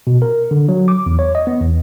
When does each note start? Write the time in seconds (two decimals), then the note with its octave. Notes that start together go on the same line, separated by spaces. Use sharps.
0.07 B2
0.22 A#4
0.51 D3
0.69 F#3
0.88 D6
1.06 E2
1.19 C#5
1.35 D#5
1.47 B3
1.61 E2